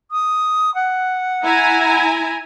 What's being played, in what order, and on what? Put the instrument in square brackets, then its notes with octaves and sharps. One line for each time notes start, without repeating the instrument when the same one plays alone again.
[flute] D#6
F#5
[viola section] E4 G#5 A#5